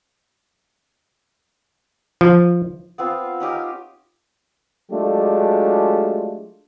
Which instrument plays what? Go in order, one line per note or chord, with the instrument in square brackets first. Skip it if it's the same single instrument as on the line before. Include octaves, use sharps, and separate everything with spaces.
[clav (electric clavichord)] F3
[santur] B3 C4 F4
C#4 D#4 G4 A#4
[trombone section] F#3 G#3 A3 D4 F4 G4